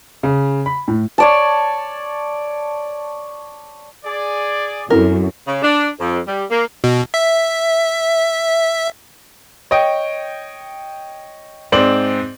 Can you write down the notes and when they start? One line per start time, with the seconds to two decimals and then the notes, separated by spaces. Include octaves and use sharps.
0.23 C#3
0.66 B5
0.88 A2
1.18 C#5 D5 A5
4.05 G#4 D5
4.90 F#2 C4 E4 A4 A#4
5.47 C#3
5.63 D4
6.00 F2
6.26 G3
6.50 A#3
6.84 B2
7.14 E5
9.71 C#5 D#5 G5
11.72 G#2 C4 D5 F#7